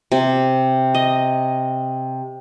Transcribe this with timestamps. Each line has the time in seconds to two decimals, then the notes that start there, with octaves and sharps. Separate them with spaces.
0.12 C3
0.95 D#5